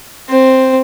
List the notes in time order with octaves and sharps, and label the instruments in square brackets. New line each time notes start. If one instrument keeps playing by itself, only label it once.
[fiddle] C4